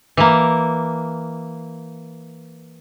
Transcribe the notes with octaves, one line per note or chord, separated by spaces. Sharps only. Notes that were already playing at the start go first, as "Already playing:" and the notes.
E3 A#3